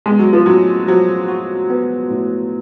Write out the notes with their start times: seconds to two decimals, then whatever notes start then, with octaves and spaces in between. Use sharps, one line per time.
0.06 G#3 B3
0.19 F#3
0.33 F3
0.46 A2 F#3
0.88 F3 F#3
1.28 F#4
1.70 B3
2.10 A2